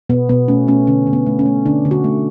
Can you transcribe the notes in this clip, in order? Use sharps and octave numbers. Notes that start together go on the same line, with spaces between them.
B2 B3
B2 B3
A3 C#4
A3 C#4
D3 C#4
D3
B3
A3
C#4
A3
D3 D4
D3
F#4
A3